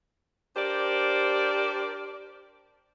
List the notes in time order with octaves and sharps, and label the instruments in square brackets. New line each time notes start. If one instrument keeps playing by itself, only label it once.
[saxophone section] D4 G4 A#4 C5 D5